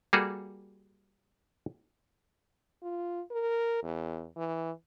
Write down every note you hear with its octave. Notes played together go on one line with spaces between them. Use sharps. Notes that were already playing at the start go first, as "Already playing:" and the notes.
G3 A#3 F#4 G#4 A4
F4
A#4
E2
E3